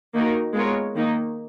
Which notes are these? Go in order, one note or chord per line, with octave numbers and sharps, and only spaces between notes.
D#3 A#3 D#4 F#4 A#4
G#3 B3 F4 A#4 C#5
D#3 A#3 D#4